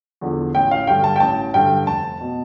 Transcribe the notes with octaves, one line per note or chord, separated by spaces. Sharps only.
E2 D3 F3
A1 G5
F5
G2 D3 G5
A5
G5
A1 A5
G2 D3 G5
F1 A5
B2